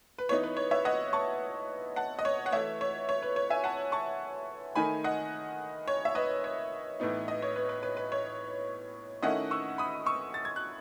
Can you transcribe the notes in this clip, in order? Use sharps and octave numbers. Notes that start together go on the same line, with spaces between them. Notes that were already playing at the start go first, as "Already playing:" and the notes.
B4
E3 B3 D#4 C#5
B4
C#5
C#5 E5
D#5 F#5
A5 C#6
F#5 A5
D#5
C#5
F#5
E3 A3 E4 C#5 E5
C#5
C#5
B4
C#5
E5 G#5
F#5 A5
A5 C#6
D#3 A3 D#4 G#5 B5
D#5 F#5
C#5
E5
B4 D#5
C#5
A2 E3 B3 D#4
D#5
C#5
B4
B4
B4
B4
C#5
D#3 A3 C#4 E4 D#5 F#5
C#6 E6
B5 D#6
C#6 E6
A6
G#6
F#6